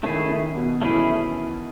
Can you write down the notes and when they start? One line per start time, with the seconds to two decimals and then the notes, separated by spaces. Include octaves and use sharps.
0.03 D#3 A3 C#4 E4 G#4
0.28 D#3
0.55 B2
0.81 E3 A3 C#4 E4 G#4